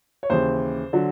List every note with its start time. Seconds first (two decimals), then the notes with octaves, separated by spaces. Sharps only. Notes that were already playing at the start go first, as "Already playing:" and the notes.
0.23 C#5
0.30 D#2 C#3 E3 C5
0.93 D3 F#3